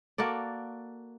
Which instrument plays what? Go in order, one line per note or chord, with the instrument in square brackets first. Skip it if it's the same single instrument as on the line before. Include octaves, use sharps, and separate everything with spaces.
[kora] A#3 F#4 A4 D5